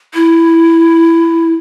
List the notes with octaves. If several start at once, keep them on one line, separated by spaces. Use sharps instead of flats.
E4